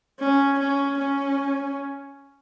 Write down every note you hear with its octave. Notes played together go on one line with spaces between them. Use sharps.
C#4
C#4
C#4